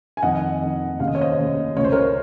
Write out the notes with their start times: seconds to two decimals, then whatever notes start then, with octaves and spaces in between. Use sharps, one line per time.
0.17 G#5
0.22 F2 D#3 D#5 F#5
0.62 F2 D#3
1.00 D#2 C#3 F5
1.08 D#5
1.15 C#5
1.21 C5 D#5
1.38 D#2 C#3
1.76 C#2 C#3 C#5
1.84 C5
1.92 A#4 C#5